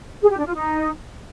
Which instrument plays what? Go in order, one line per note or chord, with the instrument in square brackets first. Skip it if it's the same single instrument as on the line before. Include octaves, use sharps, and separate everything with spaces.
[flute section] G#4
G4
D4
F4
D#4